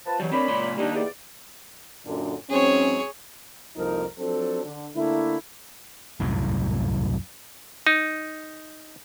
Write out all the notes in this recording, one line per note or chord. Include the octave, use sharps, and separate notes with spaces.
F3 B4 A5
E3 F#3 G3
C4 D4 A#4 C#5 D5 B5
C#2 A#2 C6
G3 A#3 D4 D#4 G4
E2 D5
F#2 A#2 D3
G#2 F#3 C4 C#4 G#4 C#5
C2 F2 F3 A#3 D#4 A#4
F3 F#3 C4 D4 A4
D3
D3 A3 A#3 E4
C2 F#2 A2
D#4